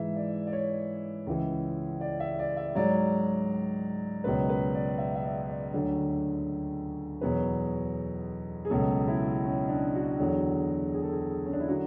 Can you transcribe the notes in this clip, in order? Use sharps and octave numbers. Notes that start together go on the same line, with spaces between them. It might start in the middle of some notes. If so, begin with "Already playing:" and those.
Already playing: G#2 E3 E5
D5
D5
C#5
C#2 C#3 E3
D5
E5
D5
E5
G#2 F#3 D5
C#2 B2 F#3 B4
B4
D5
E5
E5
D5
D5
D2 D3 F#3 D5
E2 B2 F#3 B4
G#4
C#2 B2 F#3 A4
E4
C#4
D4
F#4
E2 D3 F#3 F#4
G#4
A4
G#4
C#4
D4
E4
D3 F#3 F#4